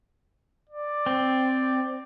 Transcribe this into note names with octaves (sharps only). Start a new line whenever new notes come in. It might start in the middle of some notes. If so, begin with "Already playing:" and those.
D5
C4